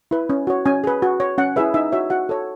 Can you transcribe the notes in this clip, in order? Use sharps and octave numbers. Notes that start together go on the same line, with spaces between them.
E4 B4
C#4
F#4 C#5
C#4 G#5
G#4 B4
F#4
C#5
C#4 F#5
E4 G#4 B4 E5
D#4 E5
F#4 C#5 E5
F#4 F#5
A4 C#5